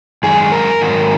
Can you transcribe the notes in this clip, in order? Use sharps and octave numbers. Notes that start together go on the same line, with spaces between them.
F#2 D#3 G#3 G#4
A#4
G#2 D#3 F#3